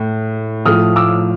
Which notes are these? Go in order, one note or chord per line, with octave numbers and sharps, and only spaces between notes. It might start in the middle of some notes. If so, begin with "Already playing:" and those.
Already playing: A2
A2 F3 D#6 F6
D6 E6